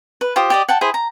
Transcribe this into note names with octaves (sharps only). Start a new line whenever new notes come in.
B4
F4 G4 C5 D#6
G4 D5 D#5
F#5 G5 A5
E4 G#4 C5
A#5